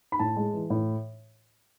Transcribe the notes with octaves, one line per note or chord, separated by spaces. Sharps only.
B5
A2 A5
G#3
E3
A2